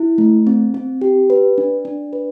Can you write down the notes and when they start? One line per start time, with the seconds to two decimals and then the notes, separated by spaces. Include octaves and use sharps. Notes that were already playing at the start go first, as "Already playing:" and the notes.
Already playing: E4
0.18 A3
0.47 C4
0.74 C4
1.01 G4
1.30 B4
1.58 D4
1.85 D4
2.13 B4